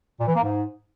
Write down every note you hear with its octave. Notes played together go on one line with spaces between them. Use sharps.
A#2
E3
A#3
G#2